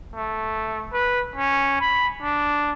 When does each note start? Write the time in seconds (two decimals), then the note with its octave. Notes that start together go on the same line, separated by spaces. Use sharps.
0.15 A3
0.93 B4
1.36 C#4
1.81 B5
2.22 D4